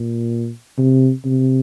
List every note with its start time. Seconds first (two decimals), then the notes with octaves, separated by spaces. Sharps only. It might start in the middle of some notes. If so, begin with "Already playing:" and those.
Already playing: A#2
0.78 C3
1.25 C3